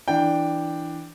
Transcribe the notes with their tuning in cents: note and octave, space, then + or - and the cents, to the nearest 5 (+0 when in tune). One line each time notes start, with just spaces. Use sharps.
E3 +0 D4 +5 G5 +0